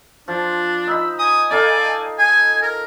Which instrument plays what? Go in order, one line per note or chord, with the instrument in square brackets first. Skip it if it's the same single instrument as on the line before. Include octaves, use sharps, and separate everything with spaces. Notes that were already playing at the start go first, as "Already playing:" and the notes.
[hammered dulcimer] F3 [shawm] D4
[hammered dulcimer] D#4 B5 [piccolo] E6
[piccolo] G#5 [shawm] D#6
[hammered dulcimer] D#4 A4 F5 [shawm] D5
[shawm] G#5 [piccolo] G#6
[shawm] A#4